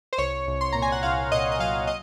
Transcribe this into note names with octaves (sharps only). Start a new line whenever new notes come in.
C5
C2 C#5
C2
C6
A#2 A#5
G#5
F#5
C2 F5
A#2 D#5
D#5
F#3 F5
D#5